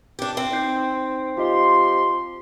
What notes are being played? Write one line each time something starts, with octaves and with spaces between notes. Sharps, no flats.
D4 G4
C4
D#4 G6 C7
F3 F4 G4 D#5 C6